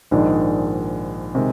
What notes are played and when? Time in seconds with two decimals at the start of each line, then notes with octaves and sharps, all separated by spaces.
0.11 A#1 G#2 D#3 G#3 D4
1.35 C3 D#3 G#3